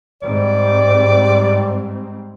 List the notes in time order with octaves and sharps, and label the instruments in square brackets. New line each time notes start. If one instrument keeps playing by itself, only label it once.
[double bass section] G#2 G3 C4 [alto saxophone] D5